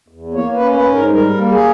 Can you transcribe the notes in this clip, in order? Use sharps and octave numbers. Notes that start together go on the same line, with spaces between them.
E2
A#3 C#5
B4
C#4
B4
G#2
A#4
G3 A#4
A#3
G#4